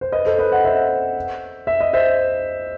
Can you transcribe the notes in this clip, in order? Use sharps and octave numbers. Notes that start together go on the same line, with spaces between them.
C5
B4 D#5
A4 C5
B4 D#5
D#5 F#5
C5 E5
E5
D#5
C5 E5